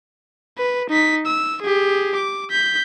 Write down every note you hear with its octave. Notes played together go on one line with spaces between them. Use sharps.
B4
D#4 B6
E6
G4 G#4
D6
G6 B6